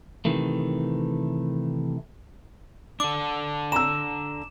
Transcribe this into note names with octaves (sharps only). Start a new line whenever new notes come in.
C3 D#3 E3 A3
D4 A4 D6
A#5 E6 E7